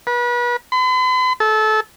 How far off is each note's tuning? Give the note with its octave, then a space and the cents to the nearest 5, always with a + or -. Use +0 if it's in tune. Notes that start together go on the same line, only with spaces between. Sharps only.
B4 -35
B5 +45
A4 -25